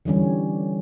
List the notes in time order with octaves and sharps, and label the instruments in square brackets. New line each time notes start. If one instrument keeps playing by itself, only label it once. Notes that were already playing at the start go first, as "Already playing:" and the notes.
[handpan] D3 E3 G3 C#4